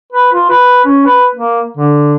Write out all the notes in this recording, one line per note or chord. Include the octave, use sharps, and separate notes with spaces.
B4
F4
B4
C#4
B4
A#3
D3